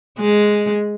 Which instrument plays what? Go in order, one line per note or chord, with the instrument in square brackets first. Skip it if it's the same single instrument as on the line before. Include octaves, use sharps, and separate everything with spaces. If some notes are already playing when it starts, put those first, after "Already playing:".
[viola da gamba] G#3